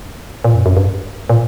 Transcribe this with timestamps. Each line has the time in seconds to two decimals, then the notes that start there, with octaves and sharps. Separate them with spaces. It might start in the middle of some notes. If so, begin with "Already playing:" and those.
0.44 A#2
0.55 F#2
0.66 F#2
0.77 G2
1.30 A#2